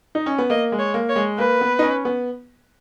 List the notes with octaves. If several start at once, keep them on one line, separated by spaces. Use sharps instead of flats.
D#4
C#4
B3
A#3 D#5
G#3
C#5
A#3
C#5
G#3
A#3 B4
B3
D#4
C#4
B3